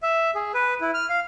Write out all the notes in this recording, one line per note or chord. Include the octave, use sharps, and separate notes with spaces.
E5
G#4
B4
E4
F6
F5